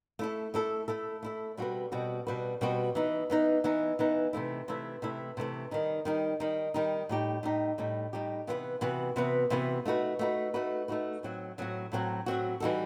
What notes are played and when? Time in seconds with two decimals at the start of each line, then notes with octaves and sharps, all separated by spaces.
0.19 A3 E4 A4
0.54 A3 E4 A4
0.88 A3 E4 A4
1.23 A3 E4 A4
1.57 B2 G3 C4 F#4 B4
1.92 B2 G3 C4 F#4 B4
2.27 B2 G3 C4 F#4 B4
2.61 B2 G3 C4 F#4 B4
2.95 E3 B3 D#4
3.30 E3 B3 D#4
3.64 E3 B3 D#4
3.99 E3 B3 D#4
4.33 C3 E3 A3 E4
4.68 C3 E3 A3 E4
5.02 C3 E3 A3 E4
5.37 C3 E3 A3 E4
5.71 D#3 G3 D#4
6.05 D#3 G3 D#4
6.40 D#3 G3 D#4
6.74 D#3 G3 D#4
7.09 A2 G3 D#4 G4
7.43 A2 G3 D#4 G4
7.78 A2 G3 D#4 G4
8.13 A2 G3 D#4 G4
8.47 C3 E3 B3 F#4 B4
8.81 C3 E3 B3 F#4 B4
9.16 C3 E3 B3 F#4 B4
9.50 C3 E3 B3 F#4 B4
9.85 A3 D#4 F#4 B4
10.19 A3 D#4 F#4 B4
10.54 A3 D#4 F#4 B4
10.88 A3 D#4 F#4 B4
11.23 A2 F#3 C4 F#4
11.58 A2 F#3 C4 F#4
11.92 A2 F#3 C4 F#4
12.26 A2 F#3 C4 F#4
12.60 E3 G3 D#4 F#4 A4